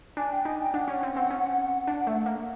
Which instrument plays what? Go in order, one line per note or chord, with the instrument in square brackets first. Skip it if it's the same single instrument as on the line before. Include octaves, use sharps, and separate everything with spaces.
[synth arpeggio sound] D4 [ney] G#5
[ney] G5
[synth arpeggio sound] D#4 [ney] G#5
[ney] G5
[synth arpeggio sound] D4 [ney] F#5
[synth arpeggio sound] C#4
C4
C4
C#4
D4
A3
A#3